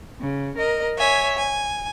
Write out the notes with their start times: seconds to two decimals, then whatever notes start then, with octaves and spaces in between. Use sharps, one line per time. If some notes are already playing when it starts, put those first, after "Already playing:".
0.21 C#3
0.58 A#4 D#5
0.98 C#5 E5 G#5
1.38 G#5